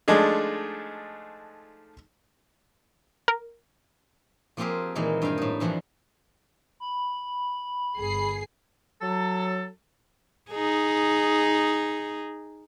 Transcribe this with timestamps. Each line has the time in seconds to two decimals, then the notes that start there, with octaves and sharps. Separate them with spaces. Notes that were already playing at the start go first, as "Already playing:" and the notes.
0.08 F3 G#3 A3 D4 D#4 G#4
3.28 A#4
4.57 F3 A#3 C4 F4 G4 G#4
4.95 A#2 D#3 E3 G#3 A#3
5.22 G2 F5 G5 G#5
5.38 A2 D#4
5.60 G2 E3 F3 D4 F#5
6.80 B5
7.97 G1 G#4 C7
9.02 F#3 A4
10.51 D#4 G#4